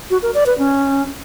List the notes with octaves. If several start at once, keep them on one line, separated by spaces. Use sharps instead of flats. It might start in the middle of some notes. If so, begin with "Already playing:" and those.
F#4
A#4
D5
B4
C#4